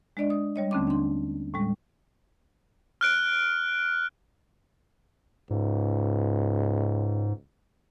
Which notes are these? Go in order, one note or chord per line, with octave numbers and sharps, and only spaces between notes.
G#3 D4 D5 D#5
D#6
G3 C#5 D#5
D#2 D3 A3 C4 C#4 D6
D4 C6
A2 G3 G#3
F6 F#6 D7
C#2 G#2